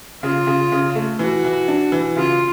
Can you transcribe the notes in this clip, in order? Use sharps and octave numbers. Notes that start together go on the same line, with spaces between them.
C#3 F4
C#3
C#3
A3
E3 F#4
E3
D4
E3
C#3 F4